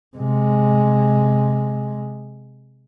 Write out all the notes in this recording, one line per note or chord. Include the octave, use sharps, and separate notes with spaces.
C3 G#3